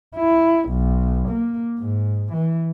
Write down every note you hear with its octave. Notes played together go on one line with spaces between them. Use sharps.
E4
B1
A#3
G#2
E3